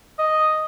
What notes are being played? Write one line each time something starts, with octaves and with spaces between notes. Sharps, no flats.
D#5